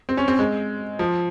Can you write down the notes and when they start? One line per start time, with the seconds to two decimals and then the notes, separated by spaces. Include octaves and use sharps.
0.09 C4
0.17 C#4
0.28 C4
0.39 G#3
0.99 F3